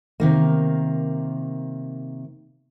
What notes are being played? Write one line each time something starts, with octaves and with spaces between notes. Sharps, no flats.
C3 D#3 A#3